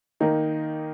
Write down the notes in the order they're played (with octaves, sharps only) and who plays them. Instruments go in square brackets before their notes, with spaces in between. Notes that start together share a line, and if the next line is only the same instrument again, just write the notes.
[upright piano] D#3 A#3 D#4